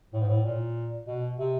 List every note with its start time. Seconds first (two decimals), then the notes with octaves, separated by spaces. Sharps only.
0.13 A2
0.21 G#2
0.28 A2
0.44 A#2
1.07 B2
1.38 C3